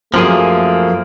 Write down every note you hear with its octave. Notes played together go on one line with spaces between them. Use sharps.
F#2 F3 A3 A#3 G#4